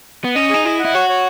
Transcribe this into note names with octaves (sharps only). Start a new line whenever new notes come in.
B3
C#4 D#5
D#4 G#4
E4 D#5
F#5
E4
F#4 C#5
C#5